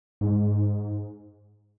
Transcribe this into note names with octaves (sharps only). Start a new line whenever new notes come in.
G#2